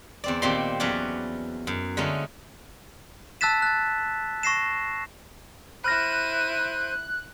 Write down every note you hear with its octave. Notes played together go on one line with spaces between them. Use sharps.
E2 C4 D5
A#2 D#3 C4 G4 C6
E2 F#3 C#4 B4 D5 C6
F#2
D3 G#3 A3 C#4 D#4
A5 E6 F#6 A6 B6 E7
F#6 A6
C#6 A#6 C7 E7
E4 C5 B5 F6 F#6 A#6 D#7